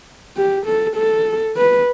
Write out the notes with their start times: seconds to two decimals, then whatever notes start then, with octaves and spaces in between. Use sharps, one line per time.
0.37 G4
0.66 A4
0.96 A4
1.57 B4